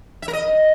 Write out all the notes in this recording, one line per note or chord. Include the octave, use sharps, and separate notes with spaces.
E5
A#4
D#5